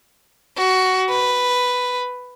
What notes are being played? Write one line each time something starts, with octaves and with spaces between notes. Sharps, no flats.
F#4
B4